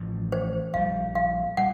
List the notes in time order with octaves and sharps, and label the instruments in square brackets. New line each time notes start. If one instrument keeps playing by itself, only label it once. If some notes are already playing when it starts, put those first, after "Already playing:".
Already playing: [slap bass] A1 A2 F3
[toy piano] C5
[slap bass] A#1 A#2 G3 [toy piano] F5
[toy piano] F5
[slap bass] A#2 G3 [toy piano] F#5